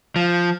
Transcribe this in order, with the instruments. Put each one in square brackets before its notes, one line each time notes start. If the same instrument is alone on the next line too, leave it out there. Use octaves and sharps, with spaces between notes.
[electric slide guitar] F3